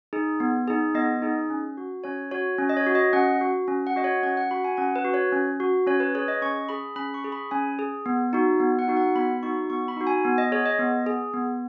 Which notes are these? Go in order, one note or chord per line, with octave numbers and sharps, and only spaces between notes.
D#4 G#4
B3
D#4 G#4
B3 D#5
D#4 G#4
C#4
F#4
C#4 C#5
F#4 C#5
C#4
D#5
C#5
F#4
D#5
C#4 F#5
F#4
C#4
F#5
F#4 D#5
C#5
C#4 F#5
F#5
F#4 B5
G#5
C#4 F#5
B4
F#4
C#5
C#4
F#4
C#4 C#5
B4
G#4 C#5
D#5
C#4 C#6
G#4 B5
C#4 B5
C#6
G#4
B5
C#4 G#5
G#4
B3
D#4 F#4
B3
F#5
D#4 F#4
F#5
B3 B5
D#4 F#4 C#6
B3 C#6
B5
D#4 F#4
G#5
B3
D#5
G#4 C#5
D#5
B3
G#4
B3